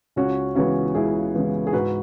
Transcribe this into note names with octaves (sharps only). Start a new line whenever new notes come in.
C#2 C#4 F#4
C#3 E3 G#3 B3 C#4 F#4
C#2 E4 G#4
C#3 E3 G#3 B3
G#4
G#2 F#4 B4